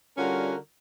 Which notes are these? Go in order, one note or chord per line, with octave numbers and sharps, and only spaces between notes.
D3 G3 C#4 F4 F#4 A#4